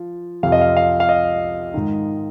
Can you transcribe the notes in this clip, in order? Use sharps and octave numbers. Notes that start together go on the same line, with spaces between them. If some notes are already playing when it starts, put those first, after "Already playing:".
Already playing: F3
F2 C3 F3 F5
D#5
F5
F5
F5
D#5
G#2 D#3